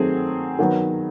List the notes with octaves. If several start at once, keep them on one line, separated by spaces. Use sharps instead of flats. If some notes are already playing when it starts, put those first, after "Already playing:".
Already playing: D#3 F#3 A3 C4 G#4
D#3 F#3 B3